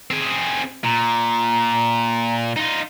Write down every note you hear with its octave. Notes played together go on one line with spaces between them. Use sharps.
C4 G#4
A#2 A#5
D#4 F4